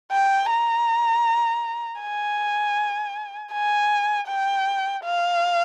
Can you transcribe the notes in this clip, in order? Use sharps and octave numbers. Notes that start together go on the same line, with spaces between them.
G5
A#5
G#5
G#5
G5
F5